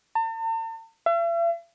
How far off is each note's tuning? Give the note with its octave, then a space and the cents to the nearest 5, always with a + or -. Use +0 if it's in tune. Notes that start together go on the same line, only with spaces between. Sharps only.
A5 +45
E5 +45